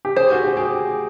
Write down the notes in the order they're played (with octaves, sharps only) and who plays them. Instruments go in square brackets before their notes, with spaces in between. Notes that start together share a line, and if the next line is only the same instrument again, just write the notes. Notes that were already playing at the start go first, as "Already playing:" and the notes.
[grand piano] G4
[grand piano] G#4 [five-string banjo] C5
[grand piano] F#4
G4
[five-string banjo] G4 [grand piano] G#4